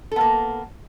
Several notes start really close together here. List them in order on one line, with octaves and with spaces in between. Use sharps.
A4 B3 A#3